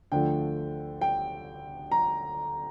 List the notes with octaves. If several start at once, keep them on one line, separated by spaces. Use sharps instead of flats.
D2 D3 F3 A3 G5
G5
A#5